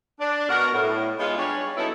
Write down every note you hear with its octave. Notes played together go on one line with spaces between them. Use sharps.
D4
B2 F#4 A#4
A2
G#3 B3 D#4 F4
G3 D4 G#4 C#5
F#3 B3 C#4 D#4 E4 A4